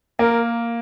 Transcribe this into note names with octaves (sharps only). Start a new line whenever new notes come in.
A#3 A#4